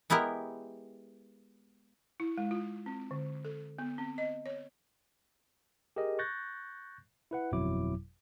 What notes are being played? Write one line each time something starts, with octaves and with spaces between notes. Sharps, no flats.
G#3 B3 E4 G4 A#4
E4
G#3
F4
C4
D3
A4
B3
C4
D#5
C#5
G4 G#4 A#4 D#5
C#6 F#6 G6 A6 A#6
E4 B4 F#5
G1 F2 B2 F#3 E4 D6